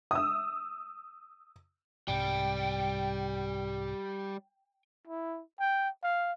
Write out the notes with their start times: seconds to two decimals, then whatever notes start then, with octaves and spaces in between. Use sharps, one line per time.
0.11 D#6 E6
2.08 C2 G#2 C3 G3 G5
5.08 E4
5.60 G5
6.03 F5